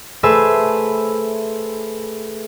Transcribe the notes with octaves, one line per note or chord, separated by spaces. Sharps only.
A3 G#4 B4 C5 E5